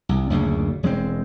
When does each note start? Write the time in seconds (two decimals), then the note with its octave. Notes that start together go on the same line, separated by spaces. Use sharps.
0.09 C2
0.30 F#1 D2 A#2 C#3
0.83 E1 G#3 B3 C4